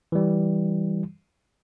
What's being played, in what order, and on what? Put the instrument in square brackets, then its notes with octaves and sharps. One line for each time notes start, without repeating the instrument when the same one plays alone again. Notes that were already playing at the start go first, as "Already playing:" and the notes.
[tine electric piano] E3 G3